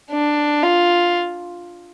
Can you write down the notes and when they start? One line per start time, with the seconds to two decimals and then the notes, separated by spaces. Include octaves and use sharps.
0.11 D4
0.63 F4